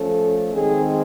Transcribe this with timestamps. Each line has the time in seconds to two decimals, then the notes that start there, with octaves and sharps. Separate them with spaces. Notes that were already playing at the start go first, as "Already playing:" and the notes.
Already playing: F3 A3 C#4 A4
0.52 D#3 G#3 C4 G#4